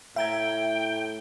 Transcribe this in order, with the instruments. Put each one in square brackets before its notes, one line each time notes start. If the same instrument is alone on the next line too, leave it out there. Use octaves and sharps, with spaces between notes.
[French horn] A2 [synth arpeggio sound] E5 A#5 G#6 [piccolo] G5